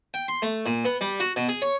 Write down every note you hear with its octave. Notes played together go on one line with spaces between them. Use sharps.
G5
C6
A3
A#2
B3
G3
F#4
B2
G#4
C#5